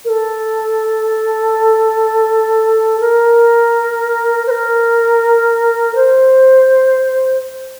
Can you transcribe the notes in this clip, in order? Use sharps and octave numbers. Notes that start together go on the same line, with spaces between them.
A#4
A4
A#4
C5
A#4
C5